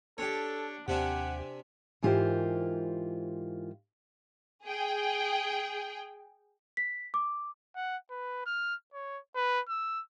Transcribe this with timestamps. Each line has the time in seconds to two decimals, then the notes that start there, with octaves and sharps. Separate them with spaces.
0.18 D4 G4 A4 C#5
0.88 D#2 C3 D4 G4 E5 F#5 G#5
2.02 G#2 E3 F4 G4 A#4 C5
4.65 G#4 G5
6.77 B6
7.14 D6
7.76 F#5
8.11 B4
8.46 F6
8.93 C#5
9.36 B4
9.69 E6